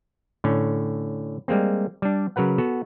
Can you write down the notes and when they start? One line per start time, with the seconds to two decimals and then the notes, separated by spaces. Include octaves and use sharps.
0.44 A2 D3 C#4
1.48 G3 G#3 A#3 C4
2.02 G3 D4
2.36 C#3 F#3 A#4 B4 F#5
2.58 B3 F#4 A4